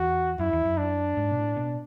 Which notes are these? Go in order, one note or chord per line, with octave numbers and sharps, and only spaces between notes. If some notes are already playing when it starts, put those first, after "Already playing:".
Already playing: E2 F#4
F#2 E4
E2
F#2
D4
G#2
B2
A2
B2